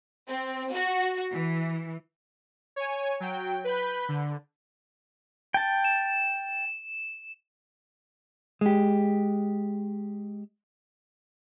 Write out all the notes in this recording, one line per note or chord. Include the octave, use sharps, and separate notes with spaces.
C4
F#4
E3
C#5 G#5
F#3 G5
B4 B5 G6
D3
G5 A5
E7
G#3 G4